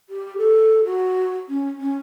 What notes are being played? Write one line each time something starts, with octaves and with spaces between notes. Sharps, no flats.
G4
A4
F#4
C#4
C#4